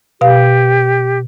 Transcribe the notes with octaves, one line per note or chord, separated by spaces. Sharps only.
B2 G4 F5